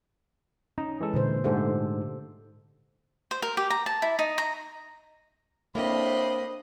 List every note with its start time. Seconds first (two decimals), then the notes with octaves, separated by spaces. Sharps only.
0.78 C#4 D#4
1.00 E3 G#3 A4
1.14 A#2 D3 C5
1.44 G#2 D3 A3 G4 A4 C5
3.31 C5
3.42 A#4
3.57 G4
3.70 A#5
3.86 A5
4.02 E4
4.19 D#4
4.38 A#5
5.75 A2 A#3 C4 D4 C5 D#5 B5